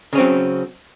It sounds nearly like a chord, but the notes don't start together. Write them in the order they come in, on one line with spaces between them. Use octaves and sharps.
C#3 C#4 C4 F#3